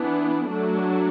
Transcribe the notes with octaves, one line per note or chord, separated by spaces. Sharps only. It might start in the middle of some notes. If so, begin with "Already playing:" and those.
Already playing: E3 B3 D4
F#3 A3 D4